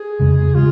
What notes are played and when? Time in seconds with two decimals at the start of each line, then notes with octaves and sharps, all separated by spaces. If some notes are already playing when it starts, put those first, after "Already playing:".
Already playing: G#4
0.20 F2 C#3 G#3
0.55 C#3 G#3 F4